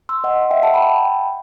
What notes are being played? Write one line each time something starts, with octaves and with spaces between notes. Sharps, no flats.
C6 E6
D#5 F#5
E5 G5
F#5 A5
G5 B5